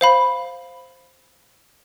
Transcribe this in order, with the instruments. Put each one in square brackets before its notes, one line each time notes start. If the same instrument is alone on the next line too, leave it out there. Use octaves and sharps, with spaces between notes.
[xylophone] C5 F5 B5